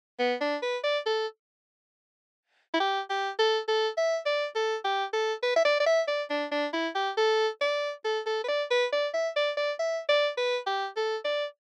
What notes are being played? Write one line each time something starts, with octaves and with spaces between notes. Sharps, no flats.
B3
D4
B4
D5
A4
E4
G4
G4
A4
A4
E5
D5
A4
G4
A4
B4
E5
D5
D5
E5
D5
D4
D4
E4
G4
A4
D5
A4
A4
B4
D5
B4
D5
E5
D5
D5
E5
D5
B4
G4
A4
D5